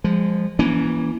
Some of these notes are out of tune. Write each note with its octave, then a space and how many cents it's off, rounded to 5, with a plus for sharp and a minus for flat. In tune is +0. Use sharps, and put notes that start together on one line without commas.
F3 +0 G#3 -30
E3 +0 A#3 +25 C#4 +25